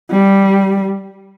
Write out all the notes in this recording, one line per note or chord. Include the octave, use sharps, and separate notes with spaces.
G3